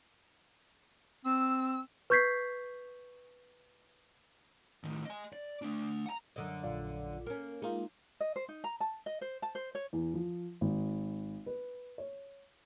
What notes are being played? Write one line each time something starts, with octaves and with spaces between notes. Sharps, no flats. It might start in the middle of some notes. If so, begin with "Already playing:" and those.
C4 E6
B4 C#6 G6 G#6 B6 C7
A2 D#3
D#5 G#5
D5
A3 D4
F#5 A#5
F#2 D3 D#5
A#1 F4 D5
A#3 C#4
G#3 A#3 D#4 F4
D#5
C5
D#4
A#5
A5
D#5
C5
A5
C5
C#5
E2
F3
G#1
B4
C#5